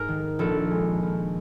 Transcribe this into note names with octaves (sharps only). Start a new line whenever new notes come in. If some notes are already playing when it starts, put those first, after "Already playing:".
Already playing: G#2 A#4
D#3
A#1 A4
G#3
A#1